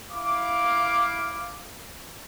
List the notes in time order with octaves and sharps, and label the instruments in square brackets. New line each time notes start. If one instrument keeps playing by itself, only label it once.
[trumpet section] E4 F5 D6